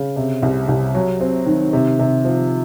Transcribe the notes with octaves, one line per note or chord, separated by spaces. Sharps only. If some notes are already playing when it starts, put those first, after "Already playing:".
Already playing: C#3
C3
C2
C2
F#3
C4
D#3
C3
C3
F3